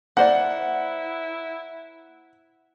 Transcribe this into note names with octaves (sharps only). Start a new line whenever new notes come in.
A#3 E4 C5 D5 F#5